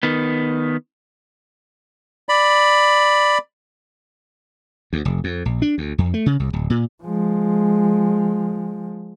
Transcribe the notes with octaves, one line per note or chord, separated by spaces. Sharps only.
D#3 B3
D5 B5
D2
F1
F2
A#1
D4
D2
F2
A3
C#3
C2
D1
A#2
F3 G#3